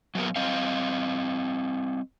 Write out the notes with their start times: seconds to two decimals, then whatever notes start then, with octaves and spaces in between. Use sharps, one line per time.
0.15 F#3 A#3 B3 A#4
0.36 G3 C4 D#5 F5